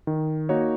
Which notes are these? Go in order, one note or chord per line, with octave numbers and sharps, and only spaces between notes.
D#3
A#3 D#4 F#4 C#5